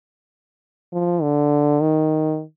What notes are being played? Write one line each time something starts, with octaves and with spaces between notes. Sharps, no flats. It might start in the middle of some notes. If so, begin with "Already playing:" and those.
F3
D3
D#3